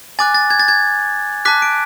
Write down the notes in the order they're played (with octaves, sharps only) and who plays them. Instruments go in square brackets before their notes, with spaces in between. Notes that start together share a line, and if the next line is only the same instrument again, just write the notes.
[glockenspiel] G#5 D6 F#6 A6
A6
G#6
A6
G#6
A5 D6 F#6 B6
D7